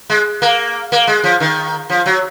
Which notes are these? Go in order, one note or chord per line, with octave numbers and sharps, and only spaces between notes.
G#3
A#3
A#3
G#3
F3
D#3
F3
F#3